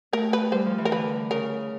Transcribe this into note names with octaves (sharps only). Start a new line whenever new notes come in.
A3 A#4
B4
G3 C5
F3
E3
A#4
D3 B4
C#3 A#4